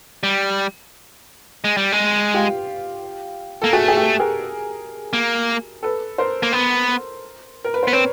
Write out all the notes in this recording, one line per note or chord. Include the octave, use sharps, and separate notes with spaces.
G3
G#3
G3
G#3
F4 G4
A#3 A4
A3 F#4 G#4
G#4
G4 A4
G#4 A#4
A#3
A4 B4
A#4 C5
A#3
B3
A#4
B4
C5
B3
C4 B4 C#5